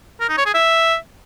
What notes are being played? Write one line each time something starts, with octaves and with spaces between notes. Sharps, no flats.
A#4
D#4
C#5
G#4
E5